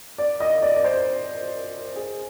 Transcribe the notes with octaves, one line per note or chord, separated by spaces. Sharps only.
D5
D#5
D5
D5
C5
G#4